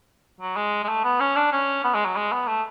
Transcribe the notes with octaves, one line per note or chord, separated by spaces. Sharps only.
F#3
G#3
G#3
A3
B3
C#4
D4
C#4
B3
G#3
F#3
G#3
B3
A3